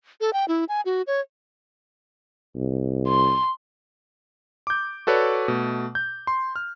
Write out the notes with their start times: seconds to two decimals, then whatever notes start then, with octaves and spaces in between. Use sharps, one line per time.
0.21 A4
0.33 G5
0.48 E4
0.69 G#5
0.86 F#4
1.07 C#5
2.55 C2
3.08 C6
4.67 D6 G6
5.07 F#4 A4 B4 C#5 D5
5.48 B2 A3
5.95 G6
6.27 C6
6.56 F6